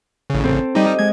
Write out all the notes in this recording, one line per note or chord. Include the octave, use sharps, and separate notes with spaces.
A1 C#3
C4 A4
G3 D#4 G4 D#5
G#3 G#6